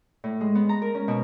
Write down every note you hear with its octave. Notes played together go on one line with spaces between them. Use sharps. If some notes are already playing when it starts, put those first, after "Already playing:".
A2
G#3
B3
A#5
A#4
C#4
B2